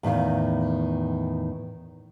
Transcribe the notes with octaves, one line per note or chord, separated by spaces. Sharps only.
E2 A2 D#3 F5